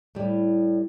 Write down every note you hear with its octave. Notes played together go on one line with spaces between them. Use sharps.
A2 G3